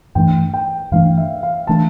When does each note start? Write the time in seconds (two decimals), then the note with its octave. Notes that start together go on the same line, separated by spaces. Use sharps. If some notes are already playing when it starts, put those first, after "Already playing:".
0.15 G2 E3 A3 D4 G5
0.54 G5
0.92 G2 E3 A3 D4 F5
1.17 E5
1.43 F5
1.67 E3 A3 D4 A5